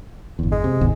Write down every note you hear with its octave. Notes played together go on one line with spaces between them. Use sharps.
G1 E2
G#3
C3
G#1 D#2 B3